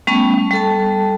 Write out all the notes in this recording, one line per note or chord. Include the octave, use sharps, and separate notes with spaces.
G3 A3 B3 C#4
G3 A4 A5